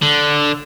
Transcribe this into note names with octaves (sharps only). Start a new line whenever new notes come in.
D3